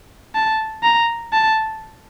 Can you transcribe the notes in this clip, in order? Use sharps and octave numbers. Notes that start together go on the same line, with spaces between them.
A5
A#5
A5